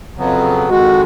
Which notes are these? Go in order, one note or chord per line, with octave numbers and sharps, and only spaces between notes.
F2 C#3 F#3 B3
F2 D#3 G#3 F#4